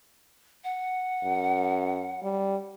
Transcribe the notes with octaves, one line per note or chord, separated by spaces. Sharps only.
F#5
F#2
G3